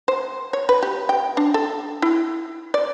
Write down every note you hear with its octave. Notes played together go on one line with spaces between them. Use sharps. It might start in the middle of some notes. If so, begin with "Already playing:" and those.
C5
C#5
B4
G4
G5
D4
A4
E4
D5